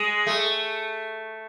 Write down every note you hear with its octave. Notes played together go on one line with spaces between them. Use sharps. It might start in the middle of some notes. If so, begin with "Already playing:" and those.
Already playing: G#3
A3